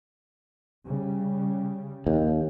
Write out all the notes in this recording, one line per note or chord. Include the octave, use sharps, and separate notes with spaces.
C#3 G3
D#2